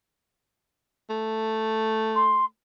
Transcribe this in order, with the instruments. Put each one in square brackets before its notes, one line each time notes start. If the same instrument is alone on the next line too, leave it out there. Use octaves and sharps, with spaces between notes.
[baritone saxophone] A3
[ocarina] C6